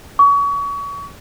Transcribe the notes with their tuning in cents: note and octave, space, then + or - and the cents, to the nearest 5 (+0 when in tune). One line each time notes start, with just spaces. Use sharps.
C#6 +35